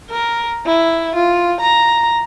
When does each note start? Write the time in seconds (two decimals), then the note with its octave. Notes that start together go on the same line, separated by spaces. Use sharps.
0.10 A#4
0.66 E4
1.15 F4
1.61 A#5